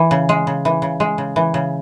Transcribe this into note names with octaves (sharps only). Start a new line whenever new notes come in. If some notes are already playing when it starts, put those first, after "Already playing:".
Already playing: E3
C#3
G#3
C#3
E3
C#3
G#3
C#3
E3
C#3